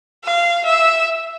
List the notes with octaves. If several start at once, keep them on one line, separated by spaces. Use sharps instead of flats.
F5
E5